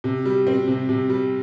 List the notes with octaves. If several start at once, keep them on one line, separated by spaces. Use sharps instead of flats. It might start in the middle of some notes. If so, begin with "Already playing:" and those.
C3
G3
C4
C3
C3
G3